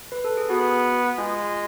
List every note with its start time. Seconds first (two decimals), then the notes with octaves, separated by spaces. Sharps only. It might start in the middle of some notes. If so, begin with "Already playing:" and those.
0.12 B4
0.24 A4
0.37 G#4
0.50 B3 F#4
1.18 G#3 F4